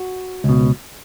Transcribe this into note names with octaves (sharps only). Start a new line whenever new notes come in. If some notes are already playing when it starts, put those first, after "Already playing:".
Already playing: F#4
C#2 B2